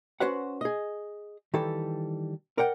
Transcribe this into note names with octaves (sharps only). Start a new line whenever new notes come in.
C#4 F#4 B4 C5 F#5
G#4 D#5
D#3 E3 G3 A4
A#4 D5 F#5 G5